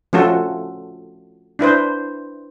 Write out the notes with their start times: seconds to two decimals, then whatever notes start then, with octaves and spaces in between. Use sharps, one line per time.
0.13 F3 A3 C#4 F4 F#4 A4
1.59 D4 E4 B4 C5